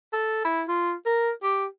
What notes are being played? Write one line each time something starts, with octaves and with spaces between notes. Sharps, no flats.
A4
E4
F4
A#4
G4